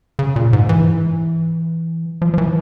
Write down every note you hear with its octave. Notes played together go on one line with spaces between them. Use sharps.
C#3
A#2
G#2
E3
F3
F3
E3